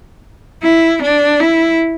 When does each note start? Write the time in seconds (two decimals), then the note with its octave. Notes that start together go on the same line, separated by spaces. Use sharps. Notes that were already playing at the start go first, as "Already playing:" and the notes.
0.63 E4
1.02 D4
1.40 E4